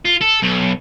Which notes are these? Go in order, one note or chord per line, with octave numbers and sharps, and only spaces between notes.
F4
A4
B1